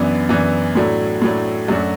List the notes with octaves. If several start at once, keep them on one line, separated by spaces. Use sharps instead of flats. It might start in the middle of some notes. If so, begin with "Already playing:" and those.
Already playing: F#2 E3 B3 D4
F#2 E3 B3 D4
A2 F#3 A3 D4
A2 F#3 A3 D4
F#2 F#3 A3 D4 F#4